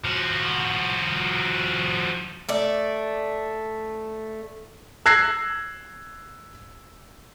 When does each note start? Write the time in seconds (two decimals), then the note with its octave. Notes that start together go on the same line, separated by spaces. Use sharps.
0.05 F3 F#4
2.49 A3 D5
5.06 E6 F#6 G#6 A#6 C7